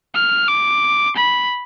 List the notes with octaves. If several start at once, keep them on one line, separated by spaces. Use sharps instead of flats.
F6
D6
B5